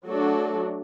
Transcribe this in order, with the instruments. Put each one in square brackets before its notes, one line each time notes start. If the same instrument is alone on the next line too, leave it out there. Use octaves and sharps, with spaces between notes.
[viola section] F#3 A3 D4 F#4 A4